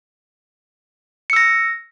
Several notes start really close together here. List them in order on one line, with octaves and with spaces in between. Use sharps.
C#7 E6 A#6